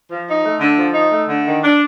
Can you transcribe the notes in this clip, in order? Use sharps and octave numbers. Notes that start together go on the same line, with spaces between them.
F3
D#4
A3
D3
F3
D#4
A3
D3
D#3
D4